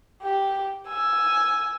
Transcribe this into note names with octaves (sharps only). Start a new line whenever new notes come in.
G4
G#5 E6